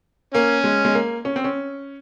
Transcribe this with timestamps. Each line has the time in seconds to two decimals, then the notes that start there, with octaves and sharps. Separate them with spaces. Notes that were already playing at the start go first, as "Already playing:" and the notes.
0.34 A#3 C#4
0.64 G#3
0.85 G#3
0.95 A#3
1.25 C#4
1.36 C4
1.44 C#4